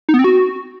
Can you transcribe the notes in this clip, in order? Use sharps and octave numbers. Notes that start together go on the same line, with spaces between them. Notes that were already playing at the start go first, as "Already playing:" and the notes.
D#4
B3
C4
F#4